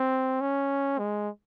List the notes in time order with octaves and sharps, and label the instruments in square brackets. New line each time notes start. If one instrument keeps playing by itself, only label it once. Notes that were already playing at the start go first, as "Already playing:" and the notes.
Already playing: [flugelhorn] C4
C#4
G#3